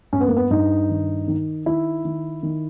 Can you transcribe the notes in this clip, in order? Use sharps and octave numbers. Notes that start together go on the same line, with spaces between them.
G2 C#4
B3
A#3
B3
G2 D#4
D#3
D#3
D#3 E4
D#3
D#3